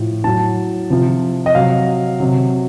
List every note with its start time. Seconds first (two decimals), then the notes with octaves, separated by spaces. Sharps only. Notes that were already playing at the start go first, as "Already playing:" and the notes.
Already playing: A2 F3
0.24 A2 F#3 A5
0.90 C3 F3
1.46 D#5
1.55 C3 F#3 F5
2.20 C3 F#3